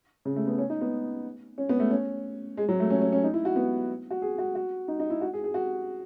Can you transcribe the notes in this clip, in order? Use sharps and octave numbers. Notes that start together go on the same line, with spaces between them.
C#3
A3
B3
C#4
D#4
B3
C#4
B3
A3
C#4
G#3
F#3
A3
C#4
C#4
C#4
D#4
E4
F#4
B3
F#4
G#4
F#4
F#4
D#4
D#4
E4
F#4
G#4
G#4
F#4